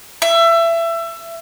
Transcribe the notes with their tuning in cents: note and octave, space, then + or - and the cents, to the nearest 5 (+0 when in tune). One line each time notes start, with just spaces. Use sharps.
E5 +25